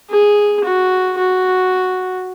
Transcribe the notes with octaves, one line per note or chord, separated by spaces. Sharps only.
G#4
F#4
F#4